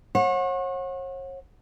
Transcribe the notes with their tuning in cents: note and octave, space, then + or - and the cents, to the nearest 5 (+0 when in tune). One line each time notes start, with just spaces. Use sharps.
C#5 -40 F#5 -25